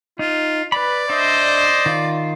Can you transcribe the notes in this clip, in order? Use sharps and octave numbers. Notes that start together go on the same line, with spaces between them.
D#4 F4
B4 D5 B5
D4 C5 D#5 E5
D#3 F4